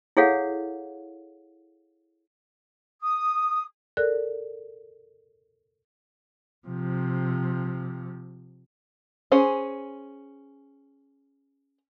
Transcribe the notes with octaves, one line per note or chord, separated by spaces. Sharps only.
E4 G#4 A4 C#5 F5 F#5
D#6
A4 A#4 D5 F#6
C3 F3
C#4 G#4 C5